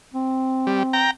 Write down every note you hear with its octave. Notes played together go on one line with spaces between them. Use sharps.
C4
G3
G5 A#5